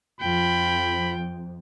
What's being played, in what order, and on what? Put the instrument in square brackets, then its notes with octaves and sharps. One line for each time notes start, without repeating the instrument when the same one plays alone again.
[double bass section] F2 [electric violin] F4 G5 [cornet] B5